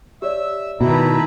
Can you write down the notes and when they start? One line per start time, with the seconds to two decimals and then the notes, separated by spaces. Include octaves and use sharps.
0.22 G4 C#5 D5 E5 E6
0.81 B2 D#3 A3 E4 B4 A#5